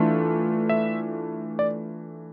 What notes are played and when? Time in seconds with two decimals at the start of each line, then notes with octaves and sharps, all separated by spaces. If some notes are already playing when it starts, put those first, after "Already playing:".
Already playing: E3 A3 D4 F4
0.69 E5
1.59 D5